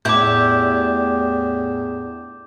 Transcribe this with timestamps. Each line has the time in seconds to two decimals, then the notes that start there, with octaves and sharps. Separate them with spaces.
0.05 E2 A2 D4 E4 G4 D6 G6